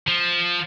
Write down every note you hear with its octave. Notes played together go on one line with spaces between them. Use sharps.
F3